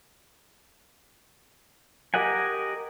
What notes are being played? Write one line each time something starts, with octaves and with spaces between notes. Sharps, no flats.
G4 A#4 D#5 F#5 G#5